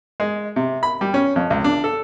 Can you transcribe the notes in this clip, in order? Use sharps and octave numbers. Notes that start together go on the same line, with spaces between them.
G#3
C3
B5
G3
C#4
F2
C#2
D4
A4